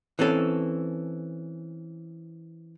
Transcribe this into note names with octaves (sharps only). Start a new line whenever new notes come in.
E3 C4 C#4 A4